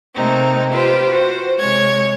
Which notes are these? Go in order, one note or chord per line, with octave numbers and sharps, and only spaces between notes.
C3 A3 A#3 C4 D#4
F4 G4 B4 C5
F#4 C5
C3 G#3 C#5 G#6